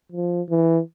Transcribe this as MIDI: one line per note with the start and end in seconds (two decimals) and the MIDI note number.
0.12 0.42 53
0.50 0.80 52